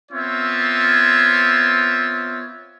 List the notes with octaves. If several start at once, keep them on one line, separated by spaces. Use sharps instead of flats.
B3 C4 F4 C#5 E5